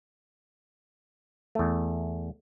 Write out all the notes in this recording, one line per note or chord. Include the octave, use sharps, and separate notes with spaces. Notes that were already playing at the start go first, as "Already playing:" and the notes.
E2 A3